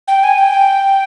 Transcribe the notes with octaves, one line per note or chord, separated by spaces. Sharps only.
G5
G#5
G5